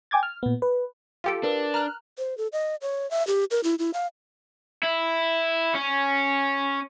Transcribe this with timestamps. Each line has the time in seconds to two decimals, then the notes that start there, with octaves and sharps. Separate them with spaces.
0.11 G5 G#5 D6 G#6 A6
0.23 F6
0.43 A#2 B3
0.62 B4
1.24 F4 G4 A4 F5 G5 D7
1.43 D4 A#4 B4
1.74 A#5 F6 F#6
2.18 C5
2.38 A4
2.53 D#5
2.82 C#5
3.11 E5
3.27 G4
3.51 A#4
3.64 E4
3.79 E4
3.94 F5
4.83 E4
5.75 C#4